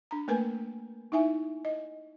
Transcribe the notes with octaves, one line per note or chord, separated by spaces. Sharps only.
D4 A#5
A3 A#3 A#4 B4 G#5
D#4 E4 E5 G#5
D#5